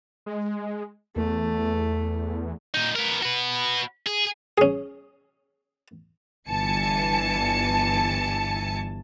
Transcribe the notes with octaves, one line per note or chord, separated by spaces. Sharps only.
G#3
E2 A3
A#2 D#4
B3 A#4
F#4 B4
G#4
C#4 G#4
G1 E3 G#5 A5 C#7